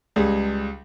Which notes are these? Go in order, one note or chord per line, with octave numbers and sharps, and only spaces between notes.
C#2 G3 G#4